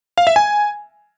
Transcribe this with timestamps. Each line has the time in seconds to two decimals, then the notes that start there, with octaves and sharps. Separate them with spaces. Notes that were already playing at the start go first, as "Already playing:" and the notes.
0.18 F5
0.27 E5
0.36 G#5